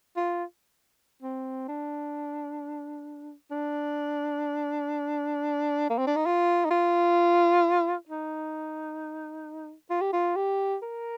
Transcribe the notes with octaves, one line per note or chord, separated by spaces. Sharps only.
F4
C4
D4
D4
A#3
C4
D4
D#4
F4
D#4
F4
D#4
F4
G4
F4
G4
A#4